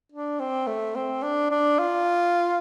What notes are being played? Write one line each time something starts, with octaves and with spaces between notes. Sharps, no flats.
D4
C4
A3
C4
D4
D4
F4